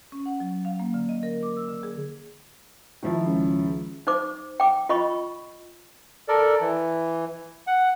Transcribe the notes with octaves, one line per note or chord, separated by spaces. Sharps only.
C#4
F#5
F#3
F5
A#3
D3
D#5
A#4
D6
E6
D3
G#4
D#3 F3 E4
C#2
D#4 C5 D6
G5 D6
F4 D#5 B5 C#6
A4 A#4 D5
E3
F#5